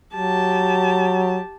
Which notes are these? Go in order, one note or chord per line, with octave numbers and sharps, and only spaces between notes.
F#3 G4 A5